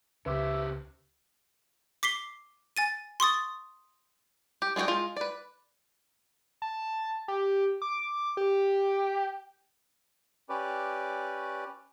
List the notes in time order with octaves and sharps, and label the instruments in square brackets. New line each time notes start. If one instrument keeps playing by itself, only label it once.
[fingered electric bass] C#2 [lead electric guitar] C#3 G4 [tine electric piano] B4 C6 D6 [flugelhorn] E5
[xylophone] D6 B6 C7 G7
G#5 A6 D#7
C6 C#6 D#6 A6
[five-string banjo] G4
G#3 D4 F4 F#4 G5
G#3 F4
B4 D5
[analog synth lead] A5
G4
D6
G4
[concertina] C#4 G4 B4 D5